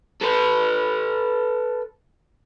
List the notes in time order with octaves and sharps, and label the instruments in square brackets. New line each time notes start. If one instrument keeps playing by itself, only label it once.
[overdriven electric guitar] A4 B4